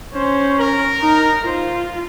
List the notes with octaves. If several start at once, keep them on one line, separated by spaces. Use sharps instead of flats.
C#4 C5
A#4
D#4
F4 C5